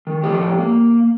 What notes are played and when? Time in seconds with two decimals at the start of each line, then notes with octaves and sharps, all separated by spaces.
0.07 D#3
0.23 A2 F3 G4
0.58 A#3